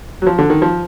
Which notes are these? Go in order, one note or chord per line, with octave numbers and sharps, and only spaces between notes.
F#3
F3
D3
D#3
F3